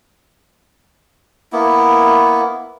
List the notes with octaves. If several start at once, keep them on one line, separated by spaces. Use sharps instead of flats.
A#3 B3 E4